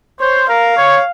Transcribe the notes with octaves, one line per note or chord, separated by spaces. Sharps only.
C5 C#5
A#4 F5
C#5